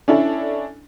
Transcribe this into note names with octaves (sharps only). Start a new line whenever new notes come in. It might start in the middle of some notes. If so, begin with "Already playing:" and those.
C#4 D4 E4 A4